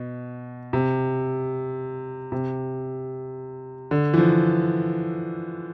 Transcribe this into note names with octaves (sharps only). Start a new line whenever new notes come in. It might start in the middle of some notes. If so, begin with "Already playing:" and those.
Already playing: B2
C3
C3
D3
E3
F3